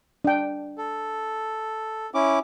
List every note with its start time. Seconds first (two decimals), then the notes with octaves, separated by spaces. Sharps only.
0.25 D4 G5
0.78 A4
2.14 C#4 E4 D6